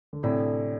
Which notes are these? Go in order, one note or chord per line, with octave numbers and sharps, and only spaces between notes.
D3
A2 C3 D4 A4 D5